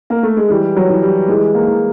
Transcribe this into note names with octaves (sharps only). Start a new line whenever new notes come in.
A#3
A3
G#3
E3 G3
F#3
E3
G3
E3 G#3
A#3
E3